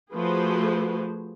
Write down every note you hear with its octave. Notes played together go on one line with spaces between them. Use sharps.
F3 A3 F#4 G#4 B4 C5